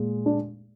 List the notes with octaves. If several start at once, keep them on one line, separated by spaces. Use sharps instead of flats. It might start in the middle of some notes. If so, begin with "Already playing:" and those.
Already playing: A#2 G#3
D4